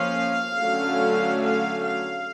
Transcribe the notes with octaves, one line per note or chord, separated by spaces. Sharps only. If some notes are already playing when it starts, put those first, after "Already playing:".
Already playing: F3 A#3 C#4 F5
D3 F#3 A3 C#4
F5
F5